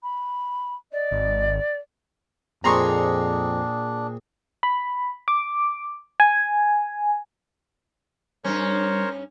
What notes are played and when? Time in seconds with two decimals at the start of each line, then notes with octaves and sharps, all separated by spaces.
0.03 B5
0.92 D5 D#5
1.11 G#1
2.64 F2 A#2 C4 D4 G#4 A#5 C6 C#6
4.63 B5
5.28 D6
6.20 G#5
8.44 G2 G3 C#4 A#4 C5 C#5